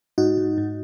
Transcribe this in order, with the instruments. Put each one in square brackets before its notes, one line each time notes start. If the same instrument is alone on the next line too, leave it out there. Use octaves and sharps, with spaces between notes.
[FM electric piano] G#2 D#4 F#4
G#2
G#2